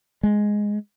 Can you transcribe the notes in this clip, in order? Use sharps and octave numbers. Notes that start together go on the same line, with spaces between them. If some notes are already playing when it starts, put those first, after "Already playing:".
G#3